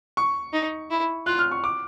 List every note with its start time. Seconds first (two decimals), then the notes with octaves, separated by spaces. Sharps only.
0.17 C#6
0.53 D#4
0.90 E4
1.26 F4 F#6
1.39 F6
1.51 C#6
1.64 D6